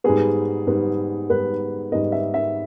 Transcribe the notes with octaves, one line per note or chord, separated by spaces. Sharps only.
G#2 G3 B3 G#4
G#2 G3 B3
G#2 G3 B3 B4
G#2 G3 B3 D#5
E5
E5